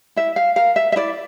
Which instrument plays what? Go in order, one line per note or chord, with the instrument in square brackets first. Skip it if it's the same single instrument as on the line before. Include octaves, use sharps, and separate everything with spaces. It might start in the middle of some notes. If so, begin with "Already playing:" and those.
[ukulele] E4 E5
F5
A#4 F5
E5
E5
E4 D5